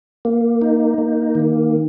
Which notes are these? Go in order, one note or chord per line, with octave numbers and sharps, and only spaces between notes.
A#3
D#4
A#3
D#3